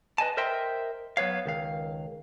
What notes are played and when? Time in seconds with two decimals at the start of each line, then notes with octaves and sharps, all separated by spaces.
0.18 B4 D#5 G#5 A5
0.37 A#4 C5 D#5 E5 G5 C6
1.17 F#3 B3 C#5 F5
1.46 C#2 D#3 F5